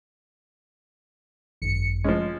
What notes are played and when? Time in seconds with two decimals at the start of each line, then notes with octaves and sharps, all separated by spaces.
1.62 G#1 F#2 C#7
2.04 F3 G#3 C#4